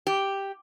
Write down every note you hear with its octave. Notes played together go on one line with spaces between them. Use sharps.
G4